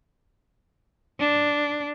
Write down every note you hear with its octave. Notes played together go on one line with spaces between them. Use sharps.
D4